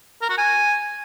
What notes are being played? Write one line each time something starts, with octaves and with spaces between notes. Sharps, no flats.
A#4
F#4
G#5